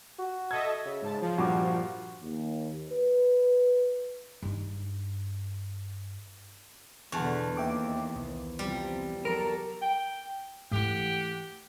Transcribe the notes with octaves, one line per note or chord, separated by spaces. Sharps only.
F#4
A4 D#5 E5 G#6
C#3 E5
G#2 A5
F3
G2 A#2 F#4 D6
D#2
B4
G2 D#4
E2 B2 D3 F#5 A5 C#6
D#2 E5 G5 D6
C2
C3 F3 G3
F#3 A4 A#4 A#5
G5
G#2 E3 A3 G4 F#5 G5